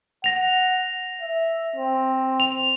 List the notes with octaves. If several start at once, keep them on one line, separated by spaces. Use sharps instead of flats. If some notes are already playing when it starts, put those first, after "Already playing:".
F#5 A#6 F7
E5
C4
F7